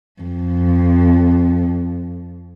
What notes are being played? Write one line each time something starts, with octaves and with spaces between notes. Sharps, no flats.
F2